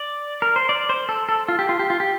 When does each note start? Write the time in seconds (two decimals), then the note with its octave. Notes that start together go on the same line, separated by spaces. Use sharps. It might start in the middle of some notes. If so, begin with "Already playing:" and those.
Already playing: D5
0.42 A#4
0.56 C5
0.69 D5
0.89 C5
1.09 A4
1.29 A4
1.48 F4
1.59 G4
1.69 F4
1.79 G4
1.90 F4
2.00 G4